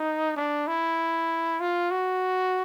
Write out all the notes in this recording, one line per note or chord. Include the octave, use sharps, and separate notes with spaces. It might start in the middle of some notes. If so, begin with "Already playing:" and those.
Already playing: D#4
D4
E4
F4
F#4